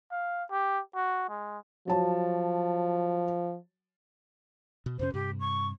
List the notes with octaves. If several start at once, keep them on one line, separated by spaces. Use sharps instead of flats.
F5
G4
F#4
G#3
F3 F#3 C#5 A5
B2
F2 C3 C#4 C5
G2 C3 G4
C#6